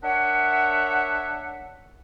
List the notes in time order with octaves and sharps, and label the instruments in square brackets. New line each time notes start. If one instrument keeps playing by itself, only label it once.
[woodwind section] D4 A#4 C#5 E5 F#5